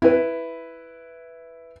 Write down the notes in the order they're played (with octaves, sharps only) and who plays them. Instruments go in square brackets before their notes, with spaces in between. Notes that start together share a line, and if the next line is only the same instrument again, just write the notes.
[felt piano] E4 B4